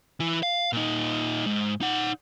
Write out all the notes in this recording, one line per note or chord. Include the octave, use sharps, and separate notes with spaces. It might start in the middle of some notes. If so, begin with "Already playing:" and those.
E3 E4
F5
A#2 D#4
G#2
D#4 F#5